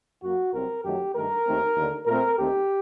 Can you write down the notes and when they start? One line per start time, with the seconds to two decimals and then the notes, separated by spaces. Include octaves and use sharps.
0.23 F#2 F#3 A#3 F#4
0.53 C2 C3 F#3 C4 A#4
0.84 F#2 D#3 F#3 A3 G4
1.15 G2 D#3 A3 A#4
1.46 D#2 D#3 A3 C4
1.77 D#2 D3 A3
2.06 A#2 A3 C4 A#4
2.38 D#2 D#3 A3 C4 G4